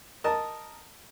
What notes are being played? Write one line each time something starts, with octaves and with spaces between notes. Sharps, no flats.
A#4 D#5 A5